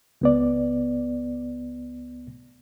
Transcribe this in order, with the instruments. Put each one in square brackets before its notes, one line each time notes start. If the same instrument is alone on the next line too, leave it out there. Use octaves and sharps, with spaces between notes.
[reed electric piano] C#2 B3 D5